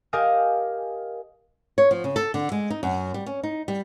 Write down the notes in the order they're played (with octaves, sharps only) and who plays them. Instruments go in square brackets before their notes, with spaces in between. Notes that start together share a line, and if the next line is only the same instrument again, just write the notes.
[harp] G4 A#4 D#5 F5 G#5
[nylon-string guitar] C#5
F3
C#3
A4
D3
G#3
D#4
F#2
G3
C#4
D#4
G3